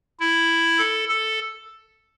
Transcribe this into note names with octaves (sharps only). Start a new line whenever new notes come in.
E4
A4
A4